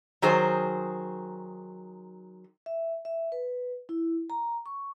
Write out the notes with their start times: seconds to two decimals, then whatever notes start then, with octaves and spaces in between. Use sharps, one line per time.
0.22 D#3 F#3 G#4 C5
2.66 E5
3.05 E5
3.32 B4
3.89 E4
4.30 A#5
4.66 C#6